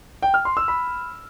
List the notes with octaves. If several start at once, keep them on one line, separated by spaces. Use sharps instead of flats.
G5
F6
C6
E6
B5